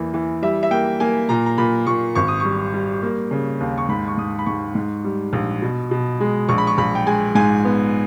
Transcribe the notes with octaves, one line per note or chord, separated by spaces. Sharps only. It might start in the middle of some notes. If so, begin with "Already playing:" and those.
Already playing: E2 E3 A#3
E3
G3 E5
E5
A#3 G5
A#3 G#5
A#2 A#5
A#5
A#2 B5
A#2 C#6
G#1 C#6
D#6
G3 C#6
G3
A#3
C#3
D#2
C#6
G#2 B5
C#6
G#2 D#6
B5
G#2 C#6
G#2
G3
A#1
B2
B2
G#3
A#1 C#6
B5
C#6
A#1 B5
G5
G#3 G#5
G#2 G#5
B3